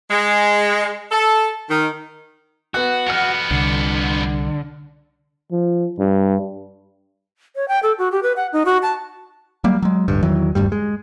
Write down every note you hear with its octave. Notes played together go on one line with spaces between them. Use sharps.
G#3
A4
D#3
B3 F#4 F#6
F2 B3 F6 C#7
C2 D3
F3
G2
C#5
G5
A4
F#4
G4
B4
F#5
D#4
F#4
A5
F#3 G3 A#3
F#3 G#3
D1 G1 G2
E2 D#3 E3 F#3
D#1 D2 G2 G3
G#3